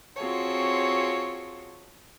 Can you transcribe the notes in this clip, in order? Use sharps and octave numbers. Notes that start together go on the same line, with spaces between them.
C4 F4 F#4 G#4 A4 C#5